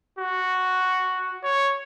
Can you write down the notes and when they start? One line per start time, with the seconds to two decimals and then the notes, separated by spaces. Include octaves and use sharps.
0.18 F#4
1.43 C#5